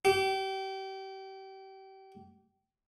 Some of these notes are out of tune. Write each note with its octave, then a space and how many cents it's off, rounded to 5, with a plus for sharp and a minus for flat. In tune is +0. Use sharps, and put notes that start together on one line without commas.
G4 -30